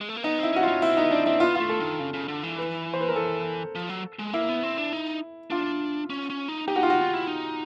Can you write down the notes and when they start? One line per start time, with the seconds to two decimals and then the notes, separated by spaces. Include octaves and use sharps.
0.01 G#3
0.09 A3
0.16 A#3
0.23 B3 D#4
0.39 C4 E4
0.53 C#4 F#4
0.63 C#4 F4
0.82 C4 E4
0.97 B3 D#4
1.11 C4 D4
1.26 C4 E4
1.40 B3 F4
1.56 A3 F4
1.69 A4
1.80 D#3
2.00 C#3
2.13 C#3
2.28 D3
2.43 E3
2.58 B4
2.94 C5
3.01 B4
3.08 A#4
3.16 A4
3.75 F3
3.89 F#3
4.19 G#3
4.33 A#3 E4
4.49 B3
4.63 C4
4.78 D4
4.93 D#4
5.50 D4 F4
6.10 C#4
6.30 C#4
6.48 D#4
6.68 D#4 G4
6.76 F#4
6.83 F4
6.90 F#4
7.01 F4
7.13 E4
7.27 D#4